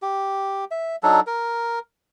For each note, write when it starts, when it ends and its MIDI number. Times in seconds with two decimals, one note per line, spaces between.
0.02 0.65 67
0.71 0.96 76
1.03 1.20 54
1.03 1.20 62
1.03 1.20 63
1.03 1.20 69
1.27 1.79 70